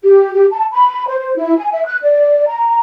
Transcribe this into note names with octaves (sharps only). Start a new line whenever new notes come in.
G4
G4
A5
B5
C5
C5
E4
G#5
E5
F#6
D5
A#5